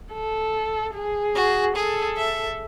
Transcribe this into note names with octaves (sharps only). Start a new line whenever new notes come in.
A4
G#4
F#4
G#4 A4
E5